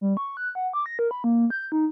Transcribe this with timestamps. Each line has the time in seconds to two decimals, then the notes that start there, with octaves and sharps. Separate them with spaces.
0.01 G3
0.17 C#6
0.37 F#6
0.55 F#5
0.73 D6
0.86 A#6
0.99 A#4
1.11 B5
1.24 A#3
1.50 G6
1.72 D#4